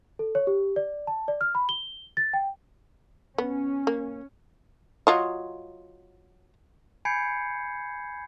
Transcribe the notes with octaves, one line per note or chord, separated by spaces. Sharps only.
A4
C#5
G4
D5
A5
D5
F6
B5
G7
A6
G5
B3 C#4
A#3
F#3 F4 D#5
G#5 B5 G6 G#6 C7 C#7